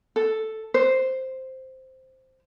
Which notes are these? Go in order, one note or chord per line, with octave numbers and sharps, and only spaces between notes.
A4
C5